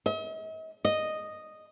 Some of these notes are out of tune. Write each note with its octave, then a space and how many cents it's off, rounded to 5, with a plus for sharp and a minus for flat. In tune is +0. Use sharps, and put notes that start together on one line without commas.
D#5 +45
D#5 -5